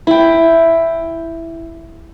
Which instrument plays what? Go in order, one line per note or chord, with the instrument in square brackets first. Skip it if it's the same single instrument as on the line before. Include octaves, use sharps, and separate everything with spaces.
[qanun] E4 G5